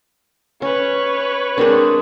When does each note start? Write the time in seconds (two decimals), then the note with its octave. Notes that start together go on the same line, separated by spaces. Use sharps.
0.62 C#4 B4 C#5
1.58 G#3 C4 D4 A#4